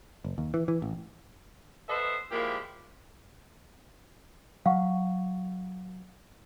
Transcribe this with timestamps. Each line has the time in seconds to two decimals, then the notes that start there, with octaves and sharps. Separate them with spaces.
0.25 F#1
0.38 D#2
0.54 E3
0.68 E3
0.82 A1
1.89 A4 B4 C5 D#5 E5 F#5
2.32 A#2 F3 G#3 A#3 E4 G4
4.66 F#3 F5 F#5 C#6